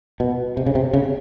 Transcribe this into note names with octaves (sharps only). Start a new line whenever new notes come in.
B2
C3
C#3
C3
C#3